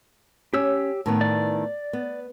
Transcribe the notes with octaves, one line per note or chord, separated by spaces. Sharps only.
C#4 G4 E6
A2 D#3 B3
D5
B3